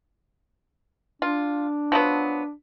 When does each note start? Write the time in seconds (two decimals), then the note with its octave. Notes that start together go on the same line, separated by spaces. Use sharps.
1.22 D4 F4
1.92 F3 F#3 B3